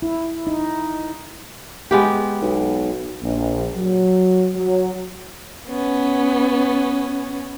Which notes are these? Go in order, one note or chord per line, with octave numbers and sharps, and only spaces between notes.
E4
D#4
G#3 B3 G4
B1
A#1
F#3
F#3
B3 C#4